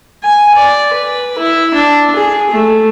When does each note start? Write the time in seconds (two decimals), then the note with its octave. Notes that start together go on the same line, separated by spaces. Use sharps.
0.23 G#5
0.54 D5
0.93 B4
1.38 E4
1.74 D4
2.16 G#4
2.51 A3